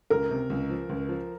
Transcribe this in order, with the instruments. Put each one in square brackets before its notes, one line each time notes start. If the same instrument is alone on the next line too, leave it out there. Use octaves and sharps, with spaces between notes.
[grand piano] C#2 [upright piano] A#4
[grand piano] C3
C#2
F3
C#2
F3